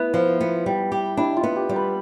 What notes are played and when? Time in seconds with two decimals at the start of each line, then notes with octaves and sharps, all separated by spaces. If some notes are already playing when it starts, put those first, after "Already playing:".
Already playing: B3 E4
0.14 F3
0.41 B3
0.66 G3
0.92 G4
1.17 D4 E4
1.37 F4
1.43 B3
1.56 G4
1.69 G3
1.76 B4